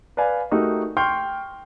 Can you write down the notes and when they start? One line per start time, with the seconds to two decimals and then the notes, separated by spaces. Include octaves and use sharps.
0.17 B4 D5 F5 G#5
0.51 A3 D#4 F#4 G4 A#4
0.97 G5 C6 C#6 F6 G6